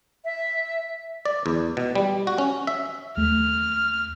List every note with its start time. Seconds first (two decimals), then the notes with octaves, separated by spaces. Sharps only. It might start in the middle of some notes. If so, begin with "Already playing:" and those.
0.25 E5
1.25 D5
1.46 E2
1.77 B2
1.95 G3
2.27 F#4
2.38 C#4
2.67 E5
3.17 D#2 A3 F6